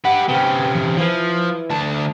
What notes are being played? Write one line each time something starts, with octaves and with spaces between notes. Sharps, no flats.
G4 B4 F#5
C3 C#4 B4 C5 G5
E3
F3 E4 B4
D2 A5